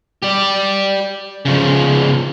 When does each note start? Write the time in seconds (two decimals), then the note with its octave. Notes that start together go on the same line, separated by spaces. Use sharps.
0.22 G4 D5
1.45 C#3 F3